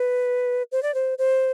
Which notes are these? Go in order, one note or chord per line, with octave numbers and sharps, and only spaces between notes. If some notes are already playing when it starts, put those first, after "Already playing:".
Already playing: B4
C5
D5
C5
C5